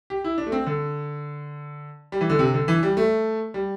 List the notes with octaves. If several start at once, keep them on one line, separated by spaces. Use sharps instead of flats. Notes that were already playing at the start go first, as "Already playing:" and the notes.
G4
E4
D4
A3
C4
D3
G3
E3
D3
C3
D3
E3
G3
A3
G3